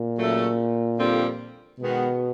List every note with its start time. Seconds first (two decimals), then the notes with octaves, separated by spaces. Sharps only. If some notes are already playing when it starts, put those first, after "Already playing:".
Already playing: A#2
0.17 C#3 F#3 A3
0.98 F2 D3 G3 C4 F4
1.79 B2 D#3 G#3 B3